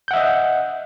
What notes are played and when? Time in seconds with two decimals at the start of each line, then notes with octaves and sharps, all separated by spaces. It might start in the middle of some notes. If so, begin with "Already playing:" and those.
0.08 G6
0.11 F#5
0.13 E5
0.16 D#5